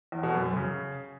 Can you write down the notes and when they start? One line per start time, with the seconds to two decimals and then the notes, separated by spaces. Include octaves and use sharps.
0.12 E2
0.23 B2
0.34 F#2
0.45 F#2
0.57 C#3